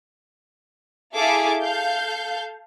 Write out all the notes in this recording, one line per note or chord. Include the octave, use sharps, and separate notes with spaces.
E4 G#4 A4 E5 F5 D6
A4 F5 G6